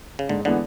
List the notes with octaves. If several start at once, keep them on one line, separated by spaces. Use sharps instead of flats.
C#3
G#2 D3
D3 E3 G#3 B3 D4